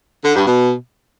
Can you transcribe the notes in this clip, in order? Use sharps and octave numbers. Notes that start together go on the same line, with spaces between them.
D3
G2
B2